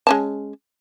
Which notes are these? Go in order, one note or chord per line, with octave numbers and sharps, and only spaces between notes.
G#3 C#4 A5